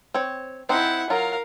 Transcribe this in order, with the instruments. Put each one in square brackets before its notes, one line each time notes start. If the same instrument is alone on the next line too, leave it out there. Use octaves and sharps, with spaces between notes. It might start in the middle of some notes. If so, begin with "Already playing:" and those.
[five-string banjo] C4 C#5
[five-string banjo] C4 D#4 C5 [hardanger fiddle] E4 F#5
[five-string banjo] F#3 F4 [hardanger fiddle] A#4 F5